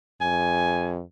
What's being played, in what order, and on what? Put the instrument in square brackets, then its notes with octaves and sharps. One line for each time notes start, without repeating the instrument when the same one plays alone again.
[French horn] F2 [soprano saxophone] G#5